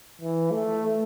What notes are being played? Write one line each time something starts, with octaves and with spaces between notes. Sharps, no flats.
E3
A3